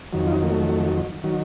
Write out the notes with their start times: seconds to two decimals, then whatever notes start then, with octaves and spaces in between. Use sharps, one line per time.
0.13 F2 D#3 F#3
0.27 F4
0.32 D#4
0.43 A#3
0.50 A3
1.23 D#3 F#3